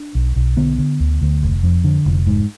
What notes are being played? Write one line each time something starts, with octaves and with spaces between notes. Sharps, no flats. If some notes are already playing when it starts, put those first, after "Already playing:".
Already playing: D4
B1
B1
D3 B3
D3
D2
D2
F1
F2
D3
F1
G#2